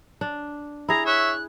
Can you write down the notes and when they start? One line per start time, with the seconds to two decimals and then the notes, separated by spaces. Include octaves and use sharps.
0.21 D4
0.88 E4 G#4 A#5
1.06 C#5 E5 F#6